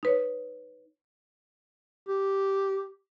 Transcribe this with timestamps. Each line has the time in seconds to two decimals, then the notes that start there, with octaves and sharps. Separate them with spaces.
0.03 D#4 B4 C#5
2.08 G4